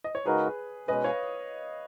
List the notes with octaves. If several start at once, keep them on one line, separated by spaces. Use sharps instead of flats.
D#5
C#5
C#3 G#3 D#4 F#4 G#4 A#4 B4
B2 G#3 C#4 B4 D#5
C#5 F5